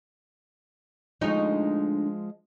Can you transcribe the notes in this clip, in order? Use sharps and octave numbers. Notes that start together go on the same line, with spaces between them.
D2 F3 G#3 D#4 C#5